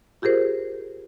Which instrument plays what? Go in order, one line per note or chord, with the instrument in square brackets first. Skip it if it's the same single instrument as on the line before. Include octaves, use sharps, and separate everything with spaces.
[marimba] F4 G4 G#4 A#4 C5